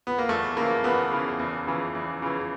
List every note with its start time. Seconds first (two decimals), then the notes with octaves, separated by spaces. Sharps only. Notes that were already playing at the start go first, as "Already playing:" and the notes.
0.07 B3
0.18 A#3
0.29 E2 A3
0.57 C#3 E3 A#3
0.84 E2 B3
1.11 C#3 E3
1.39 E2
1.67 C#3 E3
1.95 E2
2.22 C#3 E3